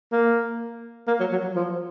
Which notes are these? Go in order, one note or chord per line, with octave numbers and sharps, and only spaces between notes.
A#3
A#3
F#3
F#3
F#3
F3